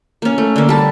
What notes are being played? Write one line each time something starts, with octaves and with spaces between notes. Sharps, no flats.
A#3 C#4
A3
D3 A#3
G3 A5